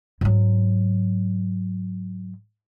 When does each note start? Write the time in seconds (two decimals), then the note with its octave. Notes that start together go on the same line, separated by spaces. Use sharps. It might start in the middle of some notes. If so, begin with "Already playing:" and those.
0.21 G#2 F#3